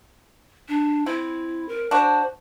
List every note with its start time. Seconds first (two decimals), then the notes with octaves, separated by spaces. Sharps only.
0.69 D4
1.06 C4 E4
1.69 A#4
1.91 D4 F#4 C5